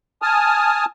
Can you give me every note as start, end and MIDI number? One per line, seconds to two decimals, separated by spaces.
0.22 0.85 80
0.22 0.85 81
0.22 0.85 87
0.22 0.85 89